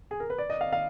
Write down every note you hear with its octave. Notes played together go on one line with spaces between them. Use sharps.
G#4
A#4
B4
D5
D#5
F5
F5